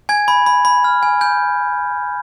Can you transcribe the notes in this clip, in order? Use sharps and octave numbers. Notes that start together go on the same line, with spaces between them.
G#5 G#6
B5
B5
B5
F6
G#5
G#5 G6